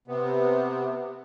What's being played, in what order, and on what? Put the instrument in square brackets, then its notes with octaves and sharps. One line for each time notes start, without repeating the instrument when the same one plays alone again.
[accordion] C3 B3